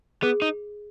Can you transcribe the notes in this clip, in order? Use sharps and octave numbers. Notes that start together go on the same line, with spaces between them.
B3 G#4
D#4